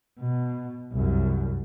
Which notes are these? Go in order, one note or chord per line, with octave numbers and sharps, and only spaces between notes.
B2
C2 F#2